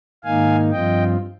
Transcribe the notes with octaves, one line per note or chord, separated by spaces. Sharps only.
G#2 D#3 A#3 D#4 F5 G#5
G2 F3 C4 F4 D#5 G5